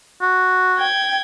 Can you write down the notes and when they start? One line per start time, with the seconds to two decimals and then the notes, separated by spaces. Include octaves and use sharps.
0.21 F#4
0.77 G5 G#6